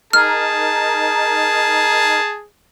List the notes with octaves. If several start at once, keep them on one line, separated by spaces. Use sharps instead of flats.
D#4 G#4 A#4 A5 F6